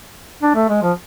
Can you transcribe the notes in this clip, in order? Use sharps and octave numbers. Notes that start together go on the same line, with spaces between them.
D4
A3
G#3
F3